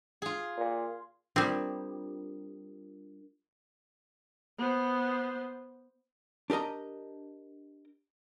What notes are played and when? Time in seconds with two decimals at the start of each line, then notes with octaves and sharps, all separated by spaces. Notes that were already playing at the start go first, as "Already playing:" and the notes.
0.22 F4 G#4
0.57 A#2
1.36 G3 C4 D4 F4 A#4
4.58 B3 C5
6.50 D4 G4 A#4 D#5 A#5